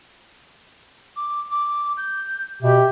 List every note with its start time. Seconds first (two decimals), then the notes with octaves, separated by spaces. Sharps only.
1.17 D6
1.52 D6
1.97 G6
2.62 B2 G4 E5